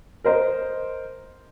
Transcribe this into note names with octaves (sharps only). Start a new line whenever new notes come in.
A#4 C5 D#5